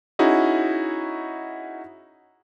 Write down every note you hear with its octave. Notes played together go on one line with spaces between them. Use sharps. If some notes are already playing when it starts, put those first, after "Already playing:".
C#4 D#4 E4 F#4 G#4